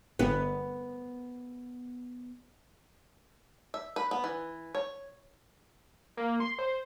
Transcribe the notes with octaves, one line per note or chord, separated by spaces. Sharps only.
G1 B3
E5
B4
B3
E3
C#5
A#3
C6
C5